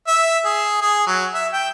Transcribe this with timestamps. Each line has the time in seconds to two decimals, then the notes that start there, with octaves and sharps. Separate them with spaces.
0.08 E5
0.45 G#4
0.81 G#4
1.07 F#3
1.34 E5
1.53 G5